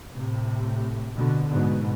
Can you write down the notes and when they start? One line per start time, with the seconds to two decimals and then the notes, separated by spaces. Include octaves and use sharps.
0.14 A2 C3
1.16 B2 D3
1.50 G#2 B2